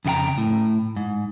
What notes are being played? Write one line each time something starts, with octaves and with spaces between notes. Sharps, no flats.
F2 C#3 D#4 G5 A#5
A2
G#2